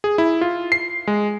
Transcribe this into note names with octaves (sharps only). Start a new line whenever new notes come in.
G#4
E4
F4
C7
G#3